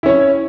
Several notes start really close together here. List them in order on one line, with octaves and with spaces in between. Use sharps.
E4 C#4 C#5